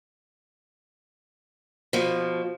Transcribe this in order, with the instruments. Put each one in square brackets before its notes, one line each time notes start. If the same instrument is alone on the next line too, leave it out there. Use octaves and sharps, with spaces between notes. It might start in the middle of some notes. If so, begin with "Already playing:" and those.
[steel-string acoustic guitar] B2 F3